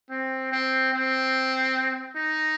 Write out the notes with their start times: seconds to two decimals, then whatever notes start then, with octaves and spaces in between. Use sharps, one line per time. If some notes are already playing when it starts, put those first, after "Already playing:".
0.10 C4
0.52 C4
0.93 C4
2.16 D#4